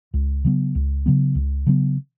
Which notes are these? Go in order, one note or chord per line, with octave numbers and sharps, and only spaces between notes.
C#2
C#3 F#3 B3
C#2
C#3 F#3 B3
C#2
C#3 F#3 B3